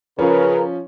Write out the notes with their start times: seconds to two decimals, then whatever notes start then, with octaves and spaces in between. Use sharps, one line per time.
0.19 C#3 F3 C#4 A#4 B4